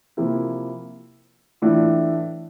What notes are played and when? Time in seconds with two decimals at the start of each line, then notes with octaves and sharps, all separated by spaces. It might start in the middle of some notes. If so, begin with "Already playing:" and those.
0.17 C3 F3 A#3 E4
1.62 A2 E3 A3 D4 F4